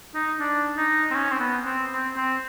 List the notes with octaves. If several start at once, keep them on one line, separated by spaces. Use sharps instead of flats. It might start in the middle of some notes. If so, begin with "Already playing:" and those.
D#4
D4
D#4
C4
C#4
C4
B3
C4
C4
C4